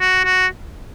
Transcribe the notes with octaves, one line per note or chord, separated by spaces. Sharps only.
F#4
F#4